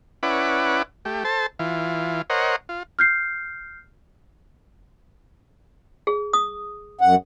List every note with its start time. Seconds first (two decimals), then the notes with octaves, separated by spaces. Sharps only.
0.23 C#4 E4 B4 D5 F#5
1.05 A3 G4
1.25 A4 C5 A5
1.59 E3 F4
2.30 A#4 C5 C#5 D#5 F#5
2.69 F4
2.99 F6 G6 C7
6.07 G#4
6.33 D#6
7.01 F#2 F#5